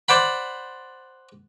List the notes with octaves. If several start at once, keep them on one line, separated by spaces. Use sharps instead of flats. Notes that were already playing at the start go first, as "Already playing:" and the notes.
C5 D5 F#5 B5